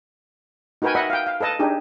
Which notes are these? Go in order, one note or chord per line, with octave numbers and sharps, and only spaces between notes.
D#4 F#4 A#4 B4 G5 G#5
D#5 E5 F#5 B5
F5 G5
F5
A4 B4 D#5 A5
D4 D#4 G4 G#4